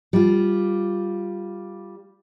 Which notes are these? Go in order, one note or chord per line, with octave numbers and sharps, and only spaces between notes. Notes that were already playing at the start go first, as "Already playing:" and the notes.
G3 F4